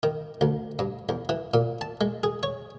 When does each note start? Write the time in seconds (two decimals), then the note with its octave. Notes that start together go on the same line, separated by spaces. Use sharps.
0.03 D#3
0.41 D2
0.79 G2
1.09 E2
1.29 E3
1.54 A#2
1.81 A5
2.01 G#3
2.23 G#4
2.43 C#5